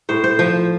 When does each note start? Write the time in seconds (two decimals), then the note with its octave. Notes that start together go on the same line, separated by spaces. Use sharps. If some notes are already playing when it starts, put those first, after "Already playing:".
0.09 A2 C5
0.24 C5
0.39 F3